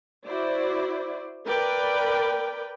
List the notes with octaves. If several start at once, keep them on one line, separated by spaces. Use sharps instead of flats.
E4 F#4 C5 D5
A#4 B4 D5 G5